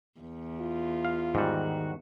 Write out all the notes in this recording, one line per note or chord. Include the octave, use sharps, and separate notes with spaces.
E2
F4
F5
G#2 D#3 G3 F#4